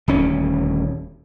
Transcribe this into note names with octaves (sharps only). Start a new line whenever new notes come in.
D#1 D2 C#4